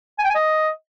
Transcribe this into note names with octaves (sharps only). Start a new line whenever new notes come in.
G#5
G5
G#5
D#5